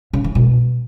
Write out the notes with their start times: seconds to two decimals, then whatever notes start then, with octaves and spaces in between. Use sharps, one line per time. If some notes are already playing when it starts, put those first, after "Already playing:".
0.13 C#3
0.24 E3
0.35 B2